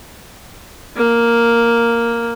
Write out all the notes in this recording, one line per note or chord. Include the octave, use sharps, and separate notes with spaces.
A#3